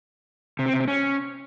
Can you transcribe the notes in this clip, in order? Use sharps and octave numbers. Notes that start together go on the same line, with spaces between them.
C3
C4
C3
C4
C#4